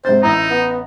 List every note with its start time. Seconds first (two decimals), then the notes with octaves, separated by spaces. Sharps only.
0.05 G#2 C3 C5 A6
0.23 A1 D#4 E4 A#5
0.50 B3